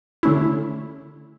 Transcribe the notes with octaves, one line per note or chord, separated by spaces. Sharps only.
D3 A3 C#4 E4